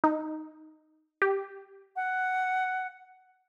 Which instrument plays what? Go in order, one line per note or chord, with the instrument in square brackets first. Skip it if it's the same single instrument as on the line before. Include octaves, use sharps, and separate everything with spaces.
[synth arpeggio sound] D#4
G4
[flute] F#5